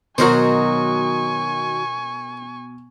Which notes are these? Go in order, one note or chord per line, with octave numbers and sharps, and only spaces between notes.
B2 D#3 F#3 F#4 A#4 C5 G#5 C#6